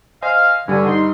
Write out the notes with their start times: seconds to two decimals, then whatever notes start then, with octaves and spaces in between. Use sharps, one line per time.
0.22 C5 D#5 F5 G#5 F6
0.68 G2 D3 G3 C#4 G#5
0.87 D#4 C6